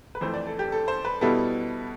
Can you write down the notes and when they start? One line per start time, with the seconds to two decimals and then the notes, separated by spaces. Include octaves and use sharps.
0.15 B4
0.21 F2 E3 A3 C5
0.34 D5
0.47 A4
0.59 G4
0.72 A4
0.88 C5
1.05 B4
1.21 B2 G3 B3 E4 A4